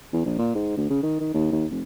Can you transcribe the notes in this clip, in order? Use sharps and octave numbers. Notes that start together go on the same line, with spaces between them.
E2
A#1
A#2
G#2
D2
C#3
D#3
D#3
D#2
D#2
F1